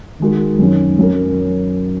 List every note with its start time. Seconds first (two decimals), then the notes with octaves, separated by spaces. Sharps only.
0.20 D#3 G#3 F#4 A#4
0.59 F#2 D#3 F#3 C#4
0.99 F#2 F#3 C#4 A#4